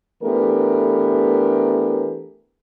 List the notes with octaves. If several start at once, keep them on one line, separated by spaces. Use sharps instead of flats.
E3 A3 B3 D4 G4 A#4